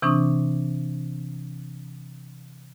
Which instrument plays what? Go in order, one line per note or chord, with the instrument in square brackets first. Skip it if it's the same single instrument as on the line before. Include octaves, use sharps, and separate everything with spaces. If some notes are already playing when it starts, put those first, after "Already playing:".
[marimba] C3 E3 C4 D4 C#6 D#6